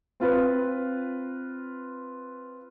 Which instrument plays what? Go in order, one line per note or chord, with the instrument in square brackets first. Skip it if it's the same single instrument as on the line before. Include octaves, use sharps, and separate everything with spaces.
[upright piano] C4 F4 B4